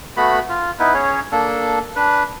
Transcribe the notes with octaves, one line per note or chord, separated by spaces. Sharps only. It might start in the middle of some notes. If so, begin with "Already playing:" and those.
A3 B3 F#4 B5
F4
B3 D#4 E4 B4
C#4 G#4 C#5
A#3 D4 A4
D4 B4